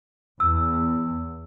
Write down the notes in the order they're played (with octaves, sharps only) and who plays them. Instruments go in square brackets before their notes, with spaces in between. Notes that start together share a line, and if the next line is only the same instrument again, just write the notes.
[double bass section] E2 [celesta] E6